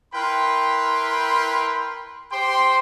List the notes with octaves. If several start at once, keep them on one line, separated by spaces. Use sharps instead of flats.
E4 A#4 B4 G5 B5 C6
G4 C5 G5 C6